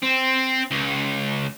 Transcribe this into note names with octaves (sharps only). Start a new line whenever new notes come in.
C4
C#2